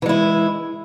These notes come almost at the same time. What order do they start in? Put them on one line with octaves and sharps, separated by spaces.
E3 G#3 E4